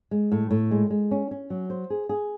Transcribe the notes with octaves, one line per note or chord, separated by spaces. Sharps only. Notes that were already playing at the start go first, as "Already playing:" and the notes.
G#3
A2
A2
G#3
G#3
C#4
C#4
F#3
C5
G#4
G#4